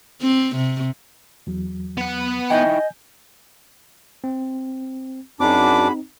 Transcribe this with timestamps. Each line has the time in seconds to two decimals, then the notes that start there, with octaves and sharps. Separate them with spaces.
0.21 C4
0.56 C3
1.47 E2 F#3
1.98 B3 F#5
2.50 D#4 E4 D#5 G5 G#5 G6
4.24 C4
5.40 F#2 C4 D4 D#4 F#4 G#4 B5 D6